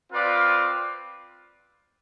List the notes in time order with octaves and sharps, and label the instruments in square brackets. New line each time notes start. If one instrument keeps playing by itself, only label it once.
[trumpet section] C4 F4 B4 D5 F5